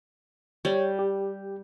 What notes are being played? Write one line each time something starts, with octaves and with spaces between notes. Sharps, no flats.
G3 C#5
G4